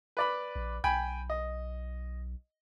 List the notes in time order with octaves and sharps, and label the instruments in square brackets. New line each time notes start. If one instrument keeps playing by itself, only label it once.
[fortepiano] B4 D5 B5
[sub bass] A#1
[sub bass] B1 [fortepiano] G5 G#5 B5
[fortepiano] D#5